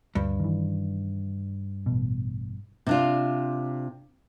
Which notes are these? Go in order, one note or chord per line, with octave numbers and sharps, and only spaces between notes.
D2 G2
D#3 E3
A1 B2
C3 D4 F4